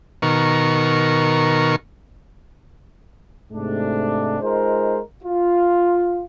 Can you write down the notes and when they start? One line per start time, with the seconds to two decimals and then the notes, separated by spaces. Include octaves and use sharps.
0.22 B2 D#3 A#4 C#6
3.52 G#2 C3 A3 D4
4.41 G#3 D#4 F4 A#4 C5
5.24 F4